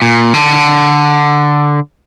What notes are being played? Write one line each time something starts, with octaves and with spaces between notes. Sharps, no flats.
A#2
D3